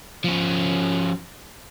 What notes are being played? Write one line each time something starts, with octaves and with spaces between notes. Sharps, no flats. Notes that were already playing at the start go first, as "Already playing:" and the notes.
F3 C#4